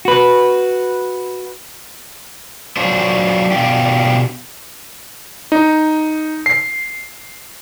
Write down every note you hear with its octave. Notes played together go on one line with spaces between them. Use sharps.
F#4 B4
F#3 D4 F4 C5
B2 D4 F4 G4
D#4
C7